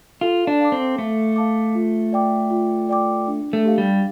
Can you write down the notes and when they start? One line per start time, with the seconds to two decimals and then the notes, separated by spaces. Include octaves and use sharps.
0.21 F4 A4
0.47 D4
0.60 F5 A5 D6
0.72 C4
0.98 A3 A4
1.36 F5 A5 D6
1.75 F4
2.13 D5 G5 D6
2.50 F4
2.89 D5 G5 D6
3.27 D4
3.53 A3
3.65 G4 F5
3.78 G3